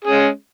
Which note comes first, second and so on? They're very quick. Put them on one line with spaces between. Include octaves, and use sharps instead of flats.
G#4 C#4 G#3